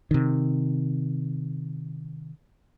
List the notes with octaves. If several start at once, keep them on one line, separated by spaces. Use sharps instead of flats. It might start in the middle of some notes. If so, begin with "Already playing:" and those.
C3 D#3